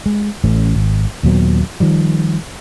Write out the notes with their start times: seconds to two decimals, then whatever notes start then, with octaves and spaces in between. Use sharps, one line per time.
0.06 G#3
0.44 A1 A3 C#4
0.74 G#1
1.23 D#2 A#2 F#3 B3
1.80 D#3 F3 G3